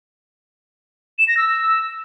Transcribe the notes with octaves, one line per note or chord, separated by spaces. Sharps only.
E7
A#6
E6